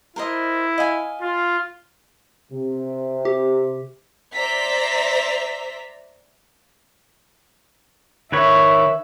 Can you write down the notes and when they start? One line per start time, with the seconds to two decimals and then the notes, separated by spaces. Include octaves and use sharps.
0.16 E4 A#4 C5 D#5
0.78 D#5 F5 G#5
1.22 F4
2.51 C3
3.25 G4
4.33 C5 D5 E5 A#5 B6
8.32 D#3 B4 C#5 E5